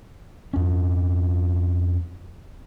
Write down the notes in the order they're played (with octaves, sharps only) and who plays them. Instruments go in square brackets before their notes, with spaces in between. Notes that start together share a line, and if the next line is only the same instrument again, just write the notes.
[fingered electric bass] F2 C#4